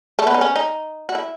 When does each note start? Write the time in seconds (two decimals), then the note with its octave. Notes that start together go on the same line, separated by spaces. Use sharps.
0.19 A3
0.27 B3
0.34 D#4
0.41 C#4
0.56 D#4
1.09 F#4
1.15 E4